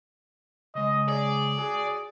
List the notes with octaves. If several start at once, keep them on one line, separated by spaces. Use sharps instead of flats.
C#3 G#3 D#5
G#4 D5
F#4 G#4